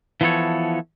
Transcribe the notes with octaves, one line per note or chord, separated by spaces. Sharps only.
E3 F3 B3 A4 C#5